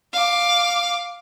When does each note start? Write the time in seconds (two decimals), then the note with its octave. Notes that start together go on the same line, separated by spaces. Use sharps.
0.13 F5 D6